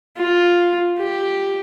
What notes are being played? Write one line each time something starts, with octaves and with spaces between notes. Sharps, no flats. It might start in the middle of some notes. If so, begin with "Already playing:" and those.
F4
G4